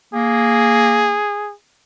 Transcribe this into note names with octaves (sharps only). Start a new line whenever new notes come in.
A#3 G#4